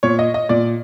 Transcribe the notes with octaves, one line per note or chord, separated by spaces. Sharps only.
A#2 C#5
D#5
D#5
A#2 D5